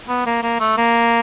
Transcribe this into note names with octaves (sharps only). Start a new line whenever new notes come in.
B3
A#3
A#3
A3
A#3